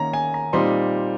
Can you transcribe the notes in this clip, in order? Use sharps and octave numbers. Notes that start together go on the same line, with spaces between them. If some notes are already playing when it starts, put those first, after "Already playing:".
Already playing: D#3 A#3 C#4 A#5
G#5
A#5
A#2 G3 C4 D#4 C6